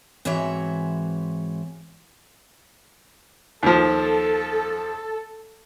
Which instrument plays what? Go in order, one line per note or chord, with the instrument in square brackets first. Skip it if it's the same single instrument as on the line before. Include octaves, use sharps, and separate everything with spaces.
[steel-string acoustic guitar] G#2 E3 C4 F#4 C#5 E5
[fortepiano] D#2 F3 [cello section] A4